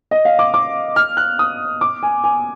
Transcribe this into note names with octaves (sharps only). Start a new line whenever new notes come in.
D#5
F5
D6
D6
F6
F#6
D#6
D6
G#5
G#5